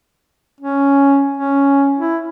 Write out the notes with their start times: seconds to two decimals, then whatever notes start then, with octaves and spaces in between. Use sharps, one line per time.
0.60 C#4
1.37 C#4
1.98 E4